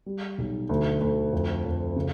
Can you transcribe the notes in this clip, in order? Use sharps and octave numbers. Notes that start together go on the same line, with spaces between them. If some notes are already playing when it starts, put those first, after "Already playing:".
G3
B1
D2
D2
F2
F2
C#3